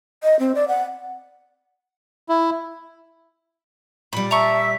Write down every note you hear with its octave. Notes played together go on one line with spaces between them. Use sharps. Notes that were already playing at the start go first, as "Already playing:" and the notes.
D#5
C4
D5
F#5
E4
A#2 G3 B5
E5 A5 A#5 C#6
B6